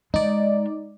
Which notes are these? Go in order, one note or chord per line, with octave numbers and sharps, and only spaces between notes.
G#3 D#4 D5